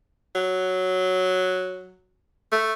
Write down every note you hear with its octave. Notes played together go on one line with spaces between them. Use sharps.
F#3
A3